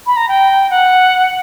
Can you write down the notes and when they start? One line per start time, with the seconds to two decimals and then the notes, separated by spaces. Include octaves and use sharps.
0.07 B5
0.17 A#5
0.29 G5
0.71 F#5